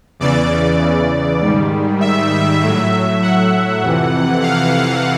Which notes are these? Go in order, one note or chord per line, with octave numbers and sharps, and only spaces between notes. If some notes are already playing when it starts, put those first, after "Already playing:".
E2 C#3 E3 D5
G#2 D#3 G3
E5
A2 F#3
F#5
F2 C3 E3
F5